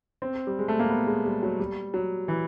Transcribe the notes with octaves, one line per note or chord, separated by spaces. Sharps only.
C4
G3
G#3
A3
A#3
B3
G#3
G3
F#3
G3
F#3
E3